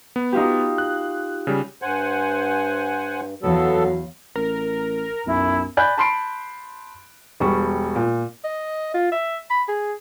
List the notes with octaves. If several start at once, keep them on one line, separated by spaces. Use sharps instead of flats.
B3
D#4 F4 G4
F#6
C#3 G3
G2 C5 F#5 G#5
E2 F#3 B3 A4 F5
A1 A#4
B1 F#2 E4
D5 G#5 B5 F#6 G6
A5 B5 C6 C7 D7
E1 G3 C#6
A#2
D#5
F4
E5
B5
G#4